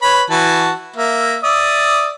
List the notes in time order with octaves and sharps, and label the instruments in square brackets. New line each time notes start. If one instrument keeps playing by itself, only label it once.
[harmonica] B4 C#5 B5
E3 F#4 A5
A#3 E5
D5 E5 D#6